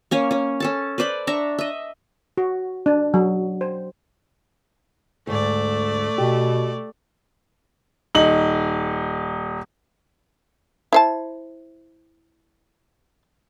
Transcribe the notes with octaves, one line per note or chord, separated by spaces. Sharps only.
A#3 C#4 C#5 G#5
C#4 C#5
C#4 A4 A5
B4 C5 D5 B5
D4 E5 A#5 C#6
D#5 E5
F#4
D4
F#3
C5
D2 G#2 A3 D5
B2 G4
D#1 D#4 F#7
E4 C5 A5